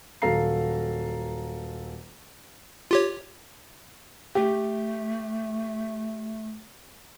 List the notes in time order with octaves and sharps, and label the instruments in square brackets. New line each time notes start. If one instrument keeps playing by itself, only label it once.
[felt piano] D#1 F#3 A4 F5 A#5 C7
[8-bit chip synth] F4 G4 C#5
[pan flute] A3 [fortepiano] G4